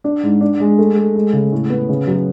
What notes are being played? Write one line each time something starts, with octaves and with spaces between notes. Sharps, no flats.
D4
G#2
D4
G#3
A3
A3
G#3
C#3
A2
B3
C#3
F#2